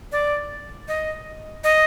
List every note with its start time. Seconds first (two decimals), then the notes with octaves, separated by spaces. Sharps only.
0.12 D5
0.88 D#5
1.64 D#5